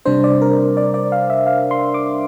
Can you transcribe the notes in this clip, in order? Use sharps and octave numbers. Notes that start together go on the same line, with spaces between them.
C3 G3 D4 C5
D5
A#4
D5
D5
F5
E5
F5
C6
D6